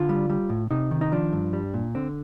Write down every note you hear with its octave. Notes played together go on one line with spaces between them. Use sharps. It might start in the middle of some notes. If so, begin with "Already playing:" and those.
Already playing: D3 F4
G3
G3
A2
C3 D#4
D#3
D#4
F3 D4
G2
G3
A#2
D3 C4